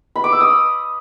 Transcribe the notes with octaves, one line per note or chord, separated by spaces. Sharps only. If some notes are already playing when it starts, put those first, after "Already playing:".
B5
D6
E6
D#6